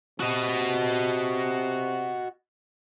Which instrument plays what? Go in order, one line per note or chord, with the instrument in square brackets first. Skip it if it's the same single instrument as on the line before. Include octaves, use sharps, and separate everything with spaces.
[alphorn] C3 [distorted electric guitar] F#4 D#5